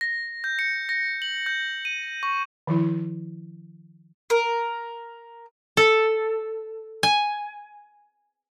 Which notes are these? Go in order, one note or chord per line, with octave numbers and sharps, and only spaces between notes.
A#6
G6
C#7
A#6
F#7
G6
D#7
C#6
D#3 F3 E4
A#4
A4
G#5